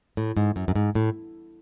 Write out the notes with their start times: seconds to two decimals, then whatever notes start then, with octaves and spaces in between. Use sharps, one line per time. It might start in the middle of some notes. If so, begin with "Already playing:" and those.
0.17 A2
0.37 G#2
0.56 F#2
0.68 F#2
0.75 G#2
0.95 A2